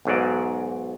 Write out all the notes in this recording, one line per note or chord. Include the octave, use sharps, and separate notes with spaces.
B1 G#2 F#3 D5